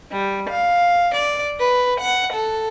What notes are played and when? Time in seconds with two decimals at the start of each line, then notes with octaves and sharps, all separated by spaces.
0.11 G3
0.50 F5
1.16 D5
1.58 B4
2.00 F#5
2.33 A4